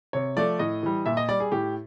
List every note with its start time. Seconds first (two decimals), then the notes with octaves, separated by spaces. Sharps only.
0.13 C3 C#5
0.37 F3 A3 D5
0.59 A2 D#5
0.83 E3 G3
1.06 A#2 E5
1.17 D#5
1.29 G3 D5
1.40 G#4
1.52 A2 G4